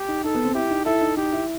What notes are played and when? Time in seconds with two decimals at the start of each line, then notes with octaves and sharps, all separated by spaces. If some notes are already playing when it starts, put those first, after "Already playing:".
Already playing: G4
0.08 D#4
0.24 D#4 A4
0.35 B3
0.45 C4
0.55 E4 G4
0.71 D#4
0.86 E4 A4
1.01 D#4
1.17 D#4 G4
1.33 E4